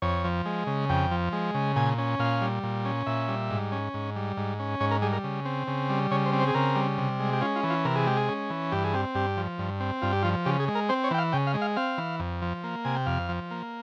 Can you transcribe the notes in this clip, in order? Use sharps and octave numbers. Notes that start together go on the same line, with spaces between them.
F2 C#5
F3
G#3
C#3
F2 G5
F3
G#3
C#3
A#2 G#5
C#4
A#2 F5
G3
A#2
C#4
A#2 E5
G3
G#2
C#4
G#2
G3
G#2
C#4
G#2 C#5
A#4
G3 G#4
A#4
C#3
C4
C#3
G3
C#3 C#5
C5
C4
C5
G#4
C#3 A#4
G3
C3
G#3
G4
C#4 F4
F4
E3
F4
C3 A#4
G#4
G#3 G4
G#4
C#4
E3
G2 G4
G#4
C4 G4
G2 G4
F3
G2
C4
G2 F4
G4
F3 F4
C#3 G4
G#4
G#3
A#4
C4 C5
C#5
E3 G5
F5
C#3 G5
F5
G#3
F5
C4 F5
E3
F2
F3
A#3
C3 G#5
G5
F2 F5
F3
A#3